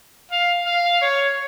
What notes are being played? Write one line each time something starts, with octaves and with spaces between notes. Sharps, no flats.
F5
F5
C#5